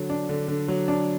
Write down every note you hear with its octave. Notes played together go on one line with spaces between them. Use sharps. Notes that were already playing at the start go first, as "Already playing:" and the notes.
Already playing: D3 F#3
D4
D3
D3
F#3
D4